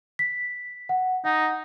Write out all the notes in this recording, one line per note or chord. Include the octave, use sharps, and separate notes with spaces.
B6
F#5
D#4 F#5